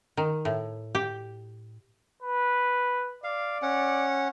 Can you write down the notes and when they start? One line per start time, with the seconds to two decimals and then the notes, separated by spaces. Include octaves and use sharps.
0.17 D#3
0.45 A2
0.95 G4
2.23 B4
3.24 D5 F5
3.62 C#4 F#5